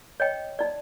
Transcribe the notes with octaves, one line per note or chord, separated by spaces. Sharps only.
C#5 D#5 G5
D#4 D5